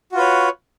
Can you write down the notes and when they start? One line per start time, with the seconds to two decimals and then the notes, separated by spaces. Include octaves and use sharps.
0.12 F#4
0.15 F4
0.17 B4
0.20 C#5